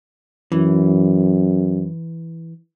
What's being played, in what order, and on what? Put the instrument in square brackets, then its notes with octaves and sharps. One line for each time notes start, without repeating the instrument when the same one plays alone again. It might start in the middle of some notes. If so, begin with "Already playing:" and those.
[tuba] F#2 [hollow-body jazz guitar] E3